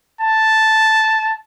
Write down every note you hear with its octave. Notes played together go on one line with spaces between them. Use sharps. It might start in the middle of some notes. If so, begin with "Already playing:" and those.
A5